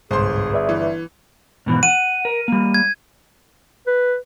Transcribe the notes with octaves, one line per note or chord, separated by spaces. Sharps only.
G1 C2 G#2 G#4 C5 C6
B4 D5 E5
E3
G#2 B2 E3
F#5 D#7
A#4
G3 A#3
G#6
B4